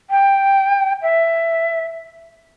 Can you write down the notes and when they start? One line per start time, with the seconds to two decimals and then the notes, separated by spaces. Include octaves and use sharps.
0.10 G5
1.02 E5